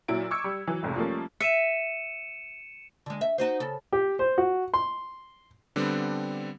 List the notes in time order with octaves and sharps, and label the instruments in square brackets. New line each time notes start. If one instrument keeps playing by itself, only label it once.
[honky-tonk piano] A#2 F#3 E4 D7
C#6 D6 E6 G#6 C#7
G3
E3 F#3
F1 F2 G#2 C3
F3 G3 A3 A#3 C#4
[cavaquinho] E5 [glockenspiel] C#7 D#7 E7
[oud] D3 G#3
E5
D#4 F#4 C5
C#3 A4
[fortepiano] G4
C5
F#4
C6
[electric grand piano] D3 G3 B3 C4 D4